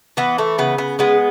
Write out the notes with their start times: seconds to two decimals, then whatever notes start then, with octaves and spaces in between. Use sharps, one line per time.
0.17 E3 B3
0.38 A3
0.58 C#3 B3
0.78 B3
0.99 G#3 B3